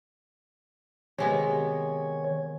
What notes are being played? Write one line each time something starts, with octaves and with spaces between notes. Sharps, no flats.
C3 D#3 G#3 B3 C#5